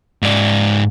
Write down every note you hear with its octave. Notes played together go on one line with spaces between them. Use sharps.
G#2 D5